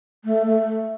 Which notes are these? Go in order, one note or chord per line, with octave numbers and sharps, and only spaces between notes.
A3
A3